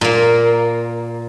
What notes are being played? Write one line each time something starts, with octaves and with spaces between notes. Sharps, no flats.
A#2 A#3